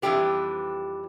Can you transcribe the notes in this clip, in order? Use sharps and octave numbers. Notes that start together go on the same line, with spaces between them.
F2 E3 G3 D4 G4 B4